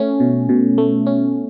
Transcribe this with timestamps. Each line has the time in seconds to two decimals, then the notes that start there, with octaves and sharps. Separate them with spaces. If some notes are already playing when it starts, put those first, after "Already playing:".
Already playing: A3 C#4
0.20 B2
0.49 B2
0.78 A3
1.06 C#4